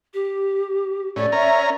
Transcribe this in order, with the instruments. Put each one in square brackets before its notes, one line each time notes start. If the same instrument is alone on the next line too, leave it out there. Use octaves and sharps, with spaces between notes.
[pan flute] G4
[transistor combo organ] A2 C#4 [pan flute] D5
[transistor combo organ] C#4 A#4 A#5 [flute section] E5